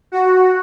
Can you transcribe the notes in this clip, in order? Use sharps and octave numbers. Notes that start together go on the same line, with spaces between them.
F#4